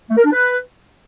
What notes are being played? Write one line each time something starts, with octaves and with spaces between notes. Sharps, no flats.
A3
A#4
D4
B4